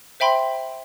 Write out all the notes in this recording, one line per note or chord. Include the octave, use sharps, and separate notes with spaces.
C5 E5 G5 B5 C6